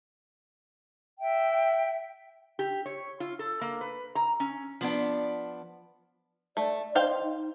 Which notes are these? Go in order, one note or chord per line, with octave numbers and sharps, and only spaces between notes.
E5 G5
G4
C#5
F4
A4
A#3
B4
A#5
C#4
F3 B3 D4
A3 D5
C5 D#5 F5 G5
D#4